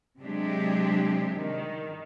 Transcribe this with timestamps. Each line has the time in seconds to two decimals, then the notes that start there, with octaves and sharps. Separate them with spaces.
0.20 C3 F#3 G#3 D4 G4
1.37 D#3